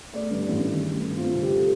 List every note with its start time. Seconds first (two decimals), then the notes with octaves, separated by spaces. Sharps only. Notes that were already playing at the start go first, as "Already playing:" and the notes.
0.14 A3 D5
0.31 G2
0.48 A1
0.65 D#3
0.83 A3
1.00 G2
1.17 C4 F4
1.30 F4
1.34 C3
1.43 G4
1.56 A4